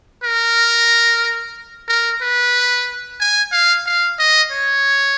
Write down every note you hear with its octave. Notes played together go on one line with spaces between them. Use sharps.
A#4
A#4
B4
G#5
F5
F5
D#5
C#5